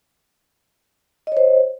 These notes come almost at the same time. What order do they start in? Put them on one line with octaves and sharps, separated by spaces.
D#5 C#5 C5